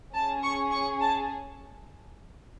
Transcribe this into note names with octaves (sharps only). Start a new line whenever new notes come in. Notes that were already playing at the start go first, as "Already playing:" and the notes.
C#4 G#4 A5
C#6
C#6
A5